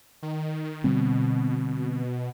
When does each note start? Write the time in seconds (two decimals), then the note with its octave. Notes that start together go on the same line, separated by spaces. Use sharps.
0.23 D#3
0.84 B2 D3 G3 C4